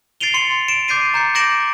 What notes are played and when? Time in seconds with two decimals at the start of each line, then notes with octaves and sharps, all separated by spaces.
0.20 A6 C7 D7 D#7 F7 G7
0.34 C6 C#7 F#7
0.68 D7 E7
0.88 D6 G6 A6 C7 D#7
1.14 A#5 G6 C#7
1.35 D6 G6 A#6 D7 E7 F#7